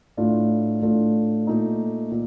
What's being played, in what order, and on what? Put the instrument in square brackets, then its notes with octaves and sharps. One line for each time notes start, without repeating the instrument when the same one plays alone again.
[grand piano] A2 A3 D4 F4
A2 A3 D4 F4
A#2 A3 D#4
A#2